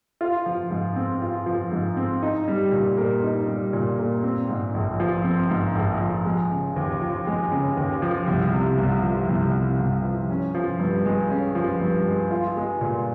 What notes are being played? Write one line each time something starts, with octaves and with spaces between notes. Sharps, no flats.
F4
F3
G#2
C4
F4
F3
G#2
C4
D#4
G3
A#2
A#3
D#4
G3
A#2
A#3
C4
G#2
A#1
F3
C4
G#2
A#1
F3
G#3
C#3
D#2
F3
G#3
C#3
D#2
F3
C2
C3
C2
F3
C2
C3
C2
F3
C#4
F3
G2
G#3
C#4
F3
G2
G#3
F4
G#3
A#2